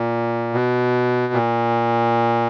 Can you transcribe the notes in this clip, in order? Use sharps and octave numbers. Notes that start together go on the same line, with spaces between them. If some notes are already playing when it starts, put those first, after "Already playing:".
Already playing: A#2
B2
A#2